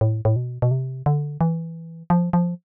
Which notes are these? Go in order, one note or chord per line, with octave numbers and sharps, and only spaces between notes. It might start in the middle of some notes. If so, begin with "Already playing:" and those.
A2
A2
B2
B2
C3
D3
E3
F3
F3